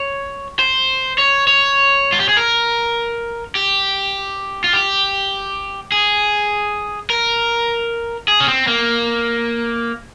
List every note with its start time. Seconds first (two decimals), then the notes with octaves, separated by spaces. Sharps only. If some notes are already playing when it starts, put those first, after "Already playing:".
Already playing: C#5
0.59 C5
1.18 C#5
1.47 C#5
2.12 F4
2.20 G4
2.29 G#4
2.37 A#4
3.55 G4
4.64 F4
4.73 G4
5.92 G#4
7.10 A#4
8.28 G#4
8.40 C#4
8.48 C4
8.67 A#3